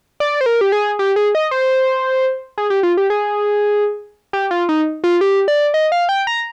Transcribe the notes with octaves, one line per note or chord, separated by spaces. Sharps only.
D5
C5
A#4
G4
G#4
G4
G#4
D#5
C5
G#4
G4
F4
G4
G#4
G4
F4
D#4
F4
G4
D5
D#5
F5
G5
A#5